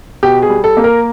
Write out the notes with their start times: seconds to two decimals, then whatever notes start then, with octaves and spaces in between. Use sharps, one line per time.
0.23 B2 G4
0.42 G#4
0.49 G3
0.64 A4
0.77 A#3
0.84 A#4